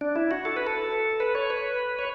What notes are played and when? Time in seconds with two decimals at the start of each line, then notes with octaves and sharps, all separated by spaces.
0.01 D4
0.16 E4
0.31 F#4
0.45 A4
0.57 B4
0.67 A4
1.20 B4
1.35 C#5
1.50 B4
1.99 C#5